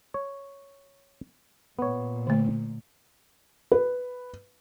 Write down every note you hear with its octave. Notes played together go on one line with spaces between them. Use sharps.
C#5
A#2 B3 C#5
D3 A3
B4